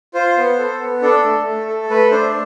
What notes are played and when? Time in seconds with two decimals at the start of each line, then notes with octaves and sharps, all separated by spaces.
0.14 F4 C5
0.37 B3
0.58 A4
0.79 B3
1.02 D4 A4
1.24 A3
1.47 A3
1.67 A4
1.90 A3 B4
2.11 D4 C5